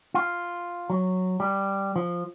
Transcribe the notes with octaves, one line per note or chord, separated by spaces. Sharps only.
F4
F#3
G3
F3